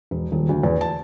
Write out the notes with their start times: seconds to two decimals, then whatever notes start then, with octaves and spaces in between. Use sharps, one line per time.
0.11 E1
0.32 D#1
0.49 D2
0.63 E2
0.81 A5